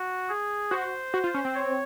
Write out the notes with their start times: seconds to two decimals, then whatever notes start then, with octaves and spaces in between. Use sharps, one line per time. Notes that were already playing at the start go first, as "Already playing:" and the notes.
Already playing: F#4
0.29 G#4
0.71 F#4 C5
1.14 F#4
1.24 F4
1.34 C#4
1.45 C4
1.55 C#5